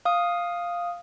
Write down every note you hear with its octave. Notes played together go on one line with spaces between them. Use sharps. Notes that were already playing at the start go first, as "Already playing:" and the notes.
F5 D#6